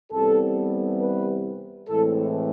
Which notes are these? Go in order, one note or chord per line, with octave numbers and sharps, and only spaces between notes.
C2 C3 E3 G3 B3 A4
B4
A2 E3 G#3 C4 A4